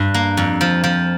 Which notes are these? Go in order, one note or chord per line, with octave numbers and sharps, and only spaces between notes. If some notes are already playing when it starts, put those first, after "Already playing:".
Already playing: G2
A#3
F2
F3
F3